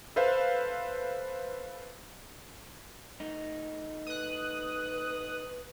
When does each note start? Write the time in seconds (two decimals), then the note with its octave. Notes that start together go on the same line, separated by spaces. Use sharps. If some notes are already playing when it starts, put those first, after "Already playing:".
0.16 A4 B4 C5 E5 F5
3.20 A3 D#4
4.07 B4 D#6 F#6